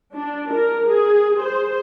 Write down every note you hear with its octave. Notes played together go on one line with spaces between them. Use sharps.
D4
A#4
G#4
C5